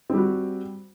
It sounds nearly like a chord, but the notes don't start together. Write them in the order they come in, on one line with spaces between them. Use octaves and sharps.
C4 G3 F#4